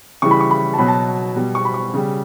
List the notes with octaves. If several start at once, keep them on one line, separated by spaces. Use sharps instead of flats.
C#3 E3 G3 C#6
B5
C#6
B5
A5
B2 F#3 B5
A5
B2 G3
C#6
B5
C#6
C#3 G3